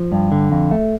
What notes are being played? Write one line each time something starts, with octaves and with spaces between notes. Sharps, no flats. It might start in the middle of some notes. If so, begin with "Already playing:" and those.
Already playing: F3
G2
D3
F2
A3